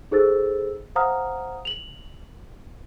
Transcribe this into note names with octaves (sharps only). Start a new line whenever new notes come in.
D#4 G#4 A4 C5 E6 A6
C5 F5 F#5 A#5 D#6 F6
F7 F#7